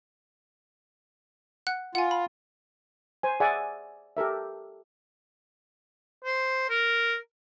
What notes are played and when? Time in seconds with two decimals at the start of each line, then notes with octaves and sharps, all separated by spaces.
1.67 F#5 F#6
1.95 F4 F#5 G#5
2.11 B5
3.23 C5 G#5
3.40 G#4 D5 E5 F#5 G#5
4.17 G4 A4 A#4 E5
6.24 C5
6.69 A#4